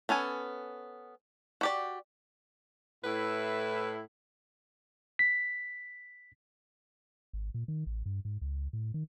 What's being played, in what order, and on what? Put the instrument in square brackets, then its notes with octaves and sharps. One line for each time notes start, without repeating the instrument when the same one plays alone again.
[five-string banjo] B3 C#4 A4 G#5
F#4 G4 D5
[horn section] A2 E4 [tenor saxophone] B4
[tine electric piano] B6
[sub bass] G#1
A#2
D#3
A1
G2
G#2
C#2
A2
D#3